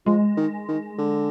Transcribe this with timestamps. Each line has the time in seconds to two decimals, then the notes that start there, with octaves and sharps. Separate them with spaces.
0.06 F3 G#3
0.37 D#3
0.68 D#3
0.98 D3